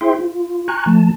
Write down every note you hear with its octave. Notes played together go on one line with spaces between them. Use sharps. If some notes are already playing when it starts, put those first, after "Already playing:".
E4 G#4 C5 E5 G5 C6
F4
G#5 A#5 C#6 F#6
F3 A3 A5